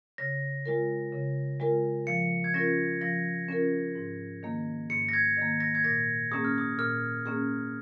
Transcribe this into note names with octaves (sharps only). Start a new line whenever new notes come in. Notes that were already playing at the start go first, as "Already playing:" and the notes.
C#3 A#6
G#3 F4 A#4
C#3
G#3 F4 A#4
F3 C#7
G#6
C#4 F4 A#4 A#6
F3 A#6
C#4 F4 A#4
G#2
D#3 A#3
G#2 C#7
A#6
G#6
D#3 A#3
A#6
G#6
A#2 A#6
A#3 C#4 G#4 D#6
F6
D#6
A#2 F6
A#3 C#4 G#4